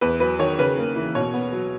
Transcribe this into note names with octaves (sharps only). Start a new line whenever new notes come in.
E2 B4
F#3 B4
D#3 C#5
C#3 B4
A#3
E3
B2 C#5
B3
F#3